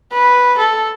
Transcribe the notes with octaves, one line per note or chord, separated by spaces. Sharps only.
B4
A4